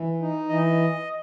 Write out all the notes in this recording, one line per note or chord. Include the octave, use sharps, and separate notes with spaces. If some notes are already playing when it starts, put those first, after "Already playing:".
Already playing: E3
D#4
E3 D#5